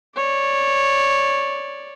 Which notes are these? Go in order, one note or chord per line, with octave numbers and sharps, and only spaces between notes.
C#5 D5